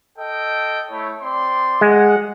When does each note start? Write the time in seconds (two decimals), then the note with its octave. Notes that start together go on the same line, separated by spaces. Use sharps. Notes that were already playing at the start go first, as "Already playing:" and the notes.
0.16 A4 D#5 G5
0.89 A3 E4 C#5
1.20 C4 D5 C6
1.81 G#3 F#5